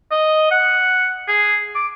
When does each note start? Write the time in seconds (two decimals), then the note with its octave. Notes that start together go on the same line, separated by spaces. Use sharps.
0.11 D#5
0.51 F#5
1.28 G#4
1.75 D6